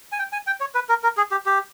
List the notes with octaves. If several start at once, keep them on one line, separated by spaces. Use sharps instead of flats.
G#5
G5
G#5
G5
C#5
B4
A#4
A#4
G#4
G4
G4